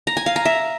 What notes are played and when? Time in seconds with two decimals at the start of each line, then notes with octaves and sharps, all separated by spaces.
0.07 A#5
0.17 G#5
0.26 F5
0.36 A#5
0.45 E5